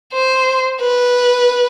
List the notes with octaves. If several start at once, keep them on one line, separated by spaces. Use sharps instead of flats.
C5
B4